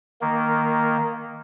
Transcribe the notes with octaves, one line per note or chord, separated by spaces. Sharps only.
D#3 A#3